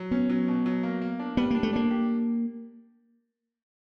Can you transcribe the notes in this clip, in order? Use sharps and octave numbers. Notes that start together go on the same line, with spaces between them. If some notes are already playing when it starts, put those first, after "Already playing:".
Already playing: F#3
B3 C#4
F#3
B2
F#3
A#3
A#3
D4
G3 B3
A#3 D4
A3
A#3 D4
G4